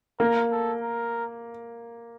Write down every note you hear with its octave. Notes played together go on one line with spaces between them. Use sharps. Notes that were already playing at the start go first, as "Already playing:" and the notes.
A#3 A#4
A4
A#4